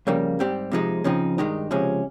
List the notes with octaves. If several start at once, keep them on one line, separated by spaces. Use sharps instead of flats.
F2 C#3 G3 A#3
G#2 G3 C4 G4
C3 F3 G#3 D#4
C#3 F3 C4 D#4
G2 D#3 G#3 D#4 G4
C#2 C3 F3 G#3 C#4